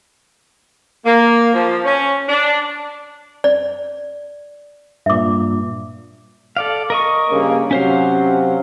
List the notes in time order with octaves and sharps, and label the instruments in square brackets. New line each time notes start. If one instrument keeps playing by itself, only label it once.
[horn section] A#3
F3
C#4
D4
[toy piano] D5
[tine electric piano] G2 A#2 [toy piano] E5 D6
[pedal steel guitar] A4 D5 F5
A#4 D#5 C#6
[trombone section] G2 C#3 A#3
[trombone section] C3 F#3 [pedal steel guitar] C#4 C5 F5